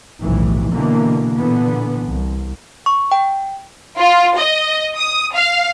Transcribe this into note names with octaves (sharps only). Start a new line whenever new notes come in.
F1 B1 A2 E3
B2 D3 E3 A#3
A#2 D3 E3 B3
C2
C#6
G5
F4
D#5
D#6
F5